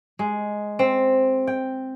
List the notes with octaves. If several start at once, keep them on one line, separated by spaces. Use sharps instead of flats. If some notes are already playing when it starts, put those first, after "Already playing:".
G#3
C4
G5